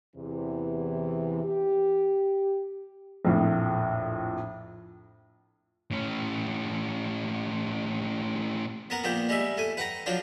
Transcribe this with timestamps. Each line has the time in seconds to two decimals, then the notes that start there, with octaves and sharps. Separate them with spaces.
0.16 E2 C3 E3
1.44 G4
3.25 A#1 F2 A2
5.92 A2 C#4
8.90 B3 A#4 F#5
9.04 A#1 A#2 B3 C5 G5
9.29 G3 G#3 E5
9.57 A3 G#5
9.77 B4 F#5 G5 A#5
10.06 F3 F#3 D4 C5